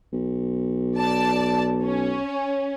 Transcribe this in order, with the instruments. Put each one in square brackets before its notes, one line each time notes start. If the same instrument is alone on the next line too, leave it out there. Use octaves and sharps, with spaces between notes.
[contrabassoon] B1
[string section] D5 A5
C#4